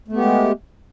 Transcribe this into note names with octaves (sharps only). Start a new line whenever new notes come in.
G#3 A3 B3 G4